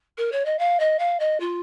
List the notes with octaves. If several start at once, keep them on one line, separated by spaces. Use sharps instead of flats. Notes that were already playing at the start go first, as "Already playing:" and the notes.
A#4
C#5
D#5
F5
D#5
F5
D#5
F4